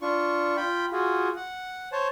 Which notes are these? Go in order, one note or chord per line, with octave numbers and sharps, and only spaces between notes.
D4 F4 C#6
F4 G5 B5
F4 F#4 G#4
F#5
C5 C#5 A5